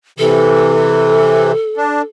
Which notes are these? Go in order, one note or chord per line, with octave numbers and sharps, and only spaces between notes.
C3 E3 A4
D4